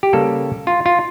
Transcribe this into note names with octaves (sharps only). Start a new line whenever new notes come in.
G4
C#3 G3 A#3 A4
F4
F4